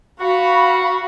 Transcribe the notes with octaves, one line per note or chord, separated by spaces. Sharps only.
F#4 F5 B5